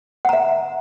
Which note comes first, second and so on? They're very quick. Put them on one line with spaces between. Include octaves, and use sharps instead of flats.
F#5 A#5 E5